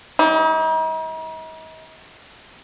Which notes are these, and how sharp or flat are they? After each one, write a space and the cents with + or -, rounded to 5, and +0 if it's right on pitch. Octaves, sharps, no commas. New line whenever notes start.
G3 -5 D#4 +40